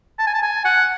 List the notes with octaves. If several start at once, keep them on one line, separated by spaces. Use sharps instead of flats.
A5
G#5
A5
G#5
F#5